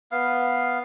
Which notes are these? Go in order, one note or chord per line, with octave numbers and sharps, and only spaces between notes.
B3 F5